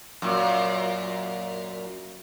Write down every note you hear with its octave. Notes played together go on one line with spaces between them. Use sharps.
F#2 A#2